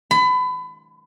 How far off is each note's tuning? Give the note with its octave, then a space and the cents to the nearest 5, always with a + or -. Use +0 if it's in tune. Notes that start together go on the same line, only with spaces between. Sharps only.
B5 +30